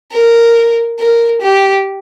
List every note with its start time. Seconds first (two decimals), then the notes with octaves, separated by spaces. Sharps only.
0.12 A#4
0.99 A#4
1.42 G4